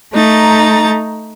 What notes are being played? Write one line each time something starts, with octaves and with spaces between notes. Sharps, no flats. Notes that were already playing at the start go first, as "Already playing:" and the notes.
A3 D#4 A#5 A6